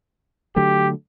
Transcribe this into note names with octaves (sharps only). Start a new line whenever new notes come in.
D3 F#3 A3 G4